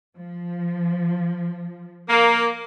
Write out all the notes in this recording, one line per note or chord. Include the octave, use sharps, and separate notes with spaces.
F3
A#3